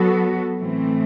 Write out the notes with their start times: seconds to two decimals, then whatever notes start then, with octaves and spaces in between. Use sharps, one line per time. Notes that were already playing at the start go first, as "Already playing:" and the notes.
Already playing: F#3 B3 F#4 A4
0.59 A2 E3 A3 C4